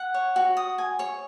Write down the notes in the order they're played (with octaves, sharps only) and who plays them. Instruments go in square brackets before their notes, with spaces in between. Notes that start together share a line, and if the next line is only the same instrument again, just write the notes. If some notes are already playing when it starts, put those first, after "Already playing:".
Already playing: [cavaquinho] F#5
C#5
F#4
D#6
G#5
C#5